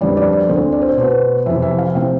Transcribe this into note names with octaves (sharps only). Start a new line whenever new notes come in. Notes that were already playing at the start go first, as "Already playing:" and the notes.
F2 D3 G3 B3 D5
D5
D5
D2 D3 A3 C4 C5
D5
C5
B2 B3 C5
F2 C3 E3 E5
E5
F5
C3 F3 C4 G5